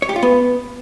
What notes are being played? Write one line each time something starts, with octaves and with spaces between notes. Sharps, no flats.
C#5
G4
F4
B3